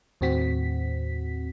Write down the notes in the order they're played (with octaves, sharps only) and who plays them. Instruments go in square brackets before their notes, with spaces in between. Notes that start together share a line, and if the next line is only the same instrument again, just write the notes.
[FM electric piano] D#2 A2 C4 F#4 B6